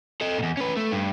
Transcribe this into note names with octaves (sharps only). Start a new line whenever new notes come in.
A4 D#5
E2 A#2
C#4 B4
A3
G2